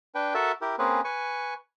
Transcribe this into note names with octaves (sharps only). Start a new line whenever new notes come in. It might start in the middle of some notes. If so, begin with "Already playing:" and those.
D4 B4 G5
F#4 A4 A#4 E5 A5
E4 G4 A#4
A#3 C4 C#4 G#4 B4
B4 G#5 C#6